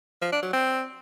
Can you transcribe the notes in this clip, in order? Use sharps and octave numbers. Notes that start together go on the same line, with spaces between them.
F3
D4
F#3
C4